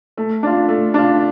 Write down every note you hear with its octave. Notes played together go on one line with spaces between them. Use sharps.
A3
D4 F4
A3
D4 F4